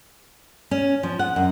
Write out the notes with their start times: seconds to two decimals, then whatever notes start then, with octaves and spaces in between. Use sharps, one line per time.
0.71 C#4
1.03 F3
1.19 F#5
1.36 F#2